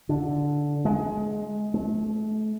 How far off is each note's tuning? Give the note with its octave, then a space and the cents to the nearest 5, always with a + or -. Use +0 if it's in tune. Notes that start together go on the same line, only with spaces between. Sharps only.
D3 -5
G#3 +20
A3 -35